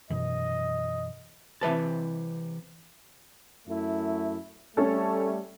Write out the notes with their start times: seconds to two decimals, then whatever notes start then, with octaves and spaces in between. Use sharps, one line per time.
0.10 F#2 B2 E3 D#5
1.61 C3 E3 B4 A5
3.67 F#2 A3 E4
4.77 G3 A3 C#4 A4